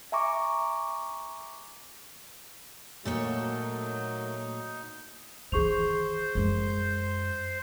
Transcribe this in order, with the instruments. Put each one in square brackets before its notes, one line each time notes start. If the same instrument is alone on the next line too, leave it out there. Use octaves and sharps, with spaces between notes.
[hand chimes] E5 G#5 A#5 C#6 D6
[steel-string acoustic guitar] A#2 A4 C#5 [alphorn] F#3 [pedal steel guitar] A3 A#3 [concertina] D#4
[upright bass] D#3 E3 [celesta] G#4 C#6 F7 [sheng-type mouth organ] C5
[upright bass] F#2 G#3